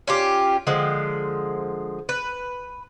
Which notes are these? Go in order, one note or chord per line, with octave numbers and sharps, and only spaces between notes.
C#4 F4 G4
D3 F3 G#3
B4